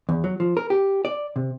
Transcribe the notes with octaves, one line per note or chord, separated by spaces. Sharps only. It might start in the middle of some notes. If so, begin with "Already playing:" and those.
E2
F#3
F3
A#4
G4
D5
C3